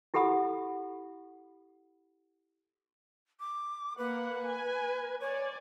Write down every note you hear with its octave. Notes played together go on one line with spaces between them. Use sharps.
E4 G4 A4 F#5 B5 D#6
D6
A#3 B4 F#5
G#5
C#5 D5 G#5